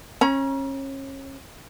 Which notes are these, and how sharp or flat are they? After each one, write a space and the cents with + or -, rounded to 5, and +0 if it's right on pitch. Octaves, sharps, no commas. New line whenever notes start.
C#4 -30 A#5 +35